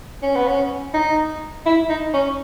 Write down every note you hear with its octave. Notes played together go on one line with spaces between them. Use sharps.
C#4
B3
C#4
D#4
E4
D#4
C#4